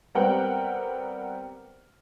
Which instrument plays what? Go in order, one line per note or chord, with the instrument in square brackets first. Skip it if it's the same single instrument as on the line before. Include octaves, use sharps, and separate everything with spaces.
[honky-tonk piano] G3 B3 C4 A#4 F#5 G5